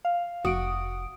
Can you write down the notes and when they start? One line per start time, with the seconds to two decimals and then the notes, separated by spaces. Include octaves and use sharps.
0.05 F5
0.45 F1 F#4 D#6 D7